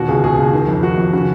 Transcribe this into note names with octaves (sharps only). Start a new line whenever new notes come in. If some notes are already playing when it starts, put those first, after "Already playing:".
Already playing: D#2 B2 F#4
C#2 G#4
B2 G#4
C#2
D#3
F2
D#3 F#4
F2
C#3 F#4